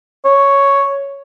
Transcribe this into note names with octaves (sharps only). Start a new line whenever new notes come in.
C#5